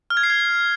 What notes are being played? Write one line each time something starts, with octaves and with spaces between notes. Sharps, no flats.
F6
G#6
C7
G#6